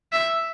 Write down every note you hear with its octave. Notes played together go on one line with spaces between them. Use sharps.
E5